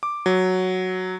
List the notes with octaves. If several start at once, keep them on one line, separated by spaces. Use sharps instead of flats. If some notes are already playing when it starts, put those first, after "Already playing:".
D6
F#3